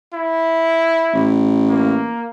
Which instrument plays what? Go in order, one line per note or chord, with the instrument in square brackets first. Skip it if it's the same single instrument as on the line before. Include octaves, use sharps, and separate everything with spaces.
[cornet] E4
[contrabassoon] A1
[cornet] A#3